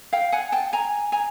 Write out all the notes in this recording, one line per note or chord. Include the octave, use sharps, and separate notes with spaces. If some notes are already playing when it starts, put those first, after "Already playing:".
F5 G5
F#5 G#5
G5 A5
G#5 A#5
G#5 A#5